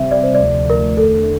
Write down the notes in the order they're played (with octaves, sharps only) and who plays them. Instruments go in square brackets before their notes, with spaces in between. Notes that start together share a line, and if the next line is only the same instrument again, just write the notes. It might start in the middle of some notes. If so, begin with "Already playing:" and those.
Already playing: [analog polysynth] C3 G3 C4 [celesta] E5
[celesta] D5
C5
D5
[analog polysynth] D2 C3 F3 A3
[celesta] A#4
[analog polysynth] E2 D3 A3 [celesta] A4